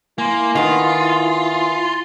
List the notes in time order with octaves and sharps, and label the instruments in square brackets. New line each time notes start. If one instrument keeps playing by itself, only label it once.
[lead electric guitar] A#3 [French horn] E4 [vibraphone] G#5 C6
[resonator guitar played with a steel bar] D#3 B3 [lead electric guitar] F4